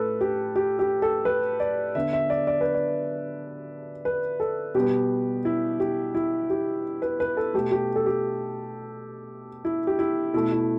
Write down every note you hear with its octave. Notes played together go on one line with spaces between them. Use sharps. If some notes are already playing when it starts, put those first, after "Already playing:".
Already playing: A2 A3 A4 B4
G4
G4
G4
A4
B4
D5
D3 B3 E5
E5
D5
D5
B4
D5
B4
A4
B2 G3 B3 G4
E4
G4
E4
G4
B4
B4
A4
B2 A3 G4
G4
A4
G4
E4
G4
E4
B2 A3 E4
E4